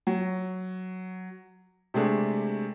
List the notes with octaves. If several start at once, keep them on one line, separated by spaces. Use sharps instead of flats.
F#3
C3 G#3 A3 D4 G#4